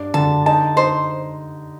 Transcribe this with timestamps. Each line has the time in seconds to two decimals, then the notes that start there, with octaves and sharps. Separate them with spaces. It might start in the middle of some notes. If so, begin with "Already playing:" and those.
Already playing: G2 D4
0.14 D3 A5
0.46 D#4 A5
0.76 D#4 C5